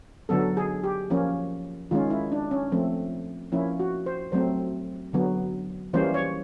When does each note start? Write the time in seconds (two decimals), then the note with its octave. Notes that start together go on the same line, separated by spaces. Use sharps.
0.29 D3 F#3 B3 A4
0.57 G#4
0.84 G4
1.10 F3 A#3 C#4
1.91 D#3 G#3 C#4 F4
2.10 E4
2.32 D4
2.51 C#4
2.72 F3 A3 C4
3.52 F3 A#3 C#4 E4
3.80 F#4
4.06 C5
4.32 F#3 A3 C4 C5
5.13 D3 F#3 B3
5.93 E3 G3 A#3 C#4 C5
6.14 C#5